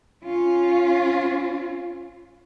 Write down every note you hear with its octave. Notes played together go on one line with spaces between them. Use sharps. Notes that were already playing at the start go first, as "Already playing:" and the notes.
C#4 F4